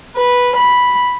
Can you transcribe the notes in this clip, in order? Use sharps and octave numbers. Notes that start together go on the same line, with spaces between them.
B4
B5